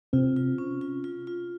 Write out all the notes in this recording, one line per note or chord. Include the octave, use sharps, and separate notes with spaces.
C3 C4 F4
F4
C#4
F4
F4
F4